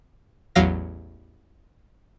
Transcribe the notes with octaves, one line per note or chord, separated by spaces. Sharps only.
A1 E2 F#3 F5 A#6